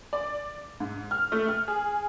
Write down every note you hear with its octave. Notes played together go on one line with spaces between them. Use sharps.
D5
G#2
F6
A3
F6
G#4